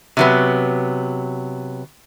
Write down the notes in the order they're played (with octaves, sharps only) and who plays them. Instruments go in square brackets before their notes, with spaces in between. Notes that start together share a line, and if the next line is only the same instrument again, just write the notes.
[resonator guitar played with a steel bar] C3 F#3 B3